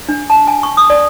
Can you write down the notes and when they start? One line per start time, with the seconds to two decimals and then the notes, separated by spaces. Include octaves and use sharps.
0.09 D4
0.30 A5
0.47 G#5
0.63 C#6
0.77 D#6
0.90 D5